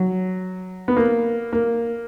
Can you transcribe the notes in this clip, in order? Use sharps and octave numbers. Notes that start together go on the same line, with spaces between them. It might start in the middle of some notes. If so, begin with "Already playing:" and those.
Already playing: F#3
B3
A#3
A#3